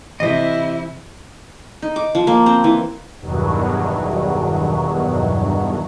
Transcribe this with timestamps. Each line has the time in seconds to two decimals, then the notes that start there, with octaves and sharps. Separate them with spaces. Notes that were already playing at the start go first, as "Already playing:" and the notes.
0.20 C3 E3 E4 C5 D#5 E5
1.82 D#4
1.96 D6
2.15 F3
2.27 A#3
2.46 C4
2.64 E3
3.22 E2 G2 B2 D#3 F#3